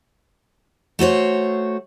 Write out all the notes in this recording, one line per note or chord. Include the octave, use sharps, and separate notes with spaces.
A3 F#4 C5 C#5